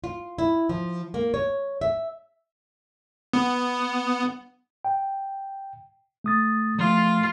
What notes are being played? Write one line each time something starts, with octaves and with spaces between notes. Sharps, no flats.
F4
E4
F3
A#3
C#5
E5
B3
G5
A3 D#6 A6
F3 A3 F4